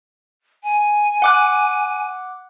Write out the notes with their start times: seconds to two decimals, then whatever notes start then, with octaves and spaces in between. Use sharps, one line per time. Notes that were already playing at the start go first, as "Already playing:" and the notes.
0.63 G#5
1.22 F#5 D6 F#6